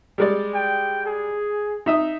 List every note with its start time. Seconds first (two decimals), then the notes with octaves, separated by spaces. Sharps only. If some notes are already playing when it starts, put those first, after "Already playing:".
0.18 G3 G#3 D5
0.54 G5
1.06 G#4
1.86 D#4 E5 D#6